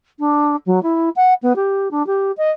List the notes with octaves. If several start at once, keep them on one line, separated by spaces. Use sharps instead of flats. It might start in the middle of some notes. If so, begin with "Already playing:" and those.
D4
F#3
E4
F#5
B3
G4
D4
G4
D#5